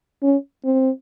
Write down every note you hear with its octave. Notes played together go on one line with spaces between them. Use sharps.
C#4
C4